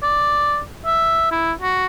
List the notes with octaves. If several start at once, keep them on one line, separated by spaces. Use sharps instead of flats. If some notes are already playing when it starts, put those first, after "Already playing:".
D5
E5
E4
F#4